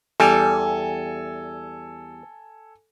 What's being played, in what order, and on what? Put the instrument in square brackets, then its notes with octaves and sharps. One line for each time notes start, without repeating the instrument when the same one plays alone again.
[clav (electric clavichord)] E2 G3 [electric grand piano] A4 G#5